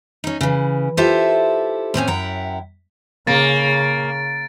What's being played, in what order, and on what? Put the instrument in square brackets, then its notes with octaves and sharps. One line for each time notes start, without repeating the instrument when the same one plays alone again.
[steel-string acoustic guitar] C#4 D#4
C#3 E3
E4 F4 G4 A4 C5 E5
A2 C4 C#4 G#5
F#2 E4 F#5 G5 A#5
[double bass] C#3 [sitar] A#3 [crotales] A6 D7